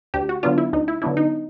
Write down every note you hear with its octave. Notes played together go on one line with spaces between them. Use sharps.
D2 G4
F#4
D3 F#3 B3 D4 F4
E4
D2 D#4
E4
D3 F#3 B3 D4 E4
D#4